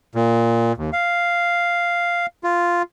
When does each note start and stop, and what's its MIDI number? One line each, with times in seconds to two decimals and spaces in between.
0.15 0.73 46
0.77 0.90 39
0.93 2.26 77
2.44 2.82 65